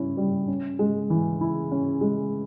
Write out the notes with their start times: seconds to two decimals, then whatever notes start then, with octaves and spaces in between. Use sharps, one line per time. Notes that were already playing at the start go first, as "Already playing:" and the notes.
Already playing: G2 C#4 E4
0.17 G3
0.48 C#4
0.79 G#3
1.10 E3
1.41 E4
1.71 C#4
2.01 G#3